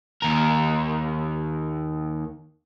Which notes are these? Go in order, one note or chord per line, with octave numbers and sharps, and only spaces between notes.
D#2 A#4